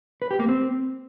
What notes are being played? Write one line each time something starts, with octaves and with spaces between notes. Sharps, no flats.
B4
G4
A#3
C4